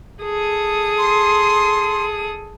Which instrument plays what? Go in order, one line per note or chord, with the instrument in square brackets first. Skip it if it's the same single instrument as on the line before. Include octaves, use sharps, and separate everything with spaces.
[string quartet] G#4 A4 D#6
[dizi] C6